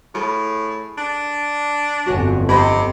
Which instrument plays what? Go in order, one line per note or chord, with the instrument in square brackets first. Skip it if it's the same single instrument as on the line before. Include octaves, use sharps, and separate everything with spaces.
[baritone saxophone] A2 [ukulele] G#4 A4
[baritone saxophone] D4
[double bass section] G1 F2 [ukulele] F#4 C#5 G#5
[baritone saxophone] C3 [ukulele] D#5 G5 B5